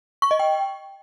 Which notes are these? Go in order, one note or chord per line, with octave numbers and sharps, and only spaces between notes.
C#6
D#5
G5